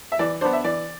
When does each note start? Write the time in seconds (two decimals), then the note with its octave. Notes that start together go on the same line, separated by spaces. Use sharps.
0.12 E5
0.19 E3 D5
0.41 B3 D4 C5
0.53 E5
0.64 E3 D5